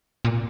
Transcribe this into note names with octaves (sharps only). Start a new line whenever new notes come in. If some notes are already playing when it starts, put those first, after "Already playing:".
A#2